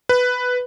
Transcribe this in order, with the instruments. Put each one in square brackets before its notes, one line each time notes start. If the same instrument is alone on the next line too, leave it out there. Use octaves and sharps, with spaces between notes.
[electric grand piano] B4